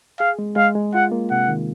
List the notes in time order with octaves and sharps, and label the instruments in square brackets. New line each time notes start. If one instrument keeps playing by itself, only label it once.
[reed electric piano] G#4 [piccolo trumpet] F5
[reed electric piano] G#3
[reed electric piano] G#3 [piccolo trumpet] F5
[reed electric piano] G#3
[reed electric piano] F4 [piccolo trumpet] F#5
[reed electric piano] A#3
[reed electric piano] C3 [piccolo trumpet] F#5
[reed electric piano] D#3